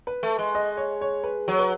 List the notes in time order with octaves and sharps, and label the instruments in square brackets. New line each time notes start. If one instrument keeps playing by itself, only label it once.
[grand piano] B4
[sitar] A3
G#3
[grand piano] D#5
C#5
C#5
B4
[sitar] F#3 [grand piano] C#5
[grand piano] B4